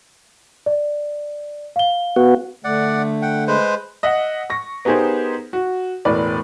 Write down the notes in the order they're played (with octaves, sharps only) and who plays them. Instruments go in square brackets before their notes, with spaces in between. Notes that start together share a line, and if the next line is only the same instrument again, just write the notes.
[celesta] D5
F5 G7
[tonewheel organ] B3 F#4
[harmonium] D3 A3 [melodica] D5 F#5
[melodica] F#5 G5
G#3 B4 C5
[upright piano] D#5 E5 F#5
C#6 A#6
B3 D#4 G4 G#4 A#4 C5
F#4
E1 A2 B4 D5